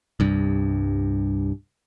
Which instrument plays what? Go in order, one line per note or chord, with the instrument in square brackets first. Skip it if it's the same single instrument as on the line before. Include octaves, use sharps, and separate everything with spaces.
[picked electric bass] C2 G2